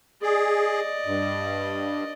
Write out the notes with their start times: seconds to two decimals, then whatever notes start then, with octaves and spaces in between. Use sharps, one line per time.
0.23 G#4 D5 D#5
1.06 G2